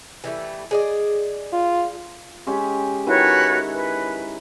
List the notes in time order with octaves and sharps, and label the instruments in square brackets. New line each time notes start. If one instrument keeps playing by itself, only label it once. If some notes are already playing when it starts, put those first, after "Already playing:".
[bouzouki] E3 G3 A3
G#4 D5 D#5
[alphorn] F4
[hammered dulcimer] G#3 C#4 G4
[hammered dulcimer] D#3 E4 G#5 [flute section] F#4 B4 C#5
[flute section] B4